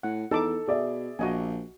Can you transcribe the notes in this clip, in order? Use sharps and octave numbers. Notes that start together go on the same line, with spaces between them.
A2 F#5
E2 D#4 A4 A5 D6
B2 G#4 D5 E5
A#1 F#4 D#5 G#5